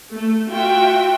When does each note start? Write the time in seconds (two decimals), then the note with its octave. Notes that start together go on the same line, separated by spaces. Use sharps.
0.13 A3
0.51 F4 F#4 E5 G5